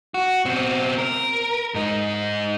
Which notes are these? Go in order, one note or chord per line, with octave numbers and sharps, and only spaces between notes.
F#4
B2 C4
A#4
G#2 D#4